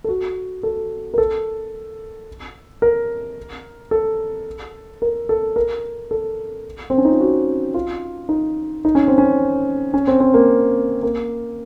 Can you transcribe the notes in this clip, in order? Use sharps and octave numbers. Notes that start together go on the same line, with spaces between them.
A4
F#4
A4
A#4
A4
A#4
A4
A#4
A4
A#4
A4
C4
C#4
D#4
F4
F#4
F4
D#4
D#4
C#4
C4
C#4
C#4
C4
C4
A#3
A#3